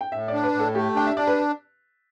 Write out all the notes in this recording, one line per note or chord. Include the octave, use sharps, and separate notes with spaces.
G5
A2 E5
D4 D5
B4
A2
A4
A3 G4
D4 G5
E5
D4 D5
B4